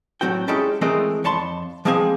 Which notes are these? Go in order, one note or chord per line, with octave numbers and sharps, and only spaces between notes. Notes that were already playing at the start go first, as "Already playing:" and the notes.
A2 F#3 C4 F#4 G5
G#3 C#4 D#4 E4 G4 A4
E3 G#3 A3 C4 A#4 D#5
F2 C#5 A5 B5 C6
F3 G#3 A#3 C4 F5 G#5